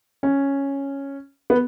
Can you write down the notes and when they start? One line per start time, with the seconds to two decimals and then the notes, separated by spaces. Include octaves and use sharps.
0.23 C#4
1.50 B3